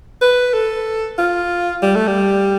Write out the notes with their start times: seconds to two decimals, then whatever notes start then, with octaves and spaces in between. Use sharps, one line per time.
0.22 B4
0.53 A4
1.18 F4
1.82 G3
1.95 A3
2.07 G3